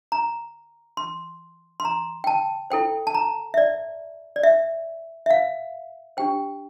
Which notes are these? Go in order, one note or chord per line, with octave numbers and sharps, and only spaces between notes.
A#5
C6
C6
A#5
G5
A5
E4 A4 C5 G5
A5
A#5
E5
D5
D5
E5
E5
F5
D4 G4 C5 G5